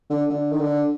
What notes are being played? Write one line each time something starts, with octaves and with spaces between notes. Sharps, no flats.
D3
D3
D#3
D3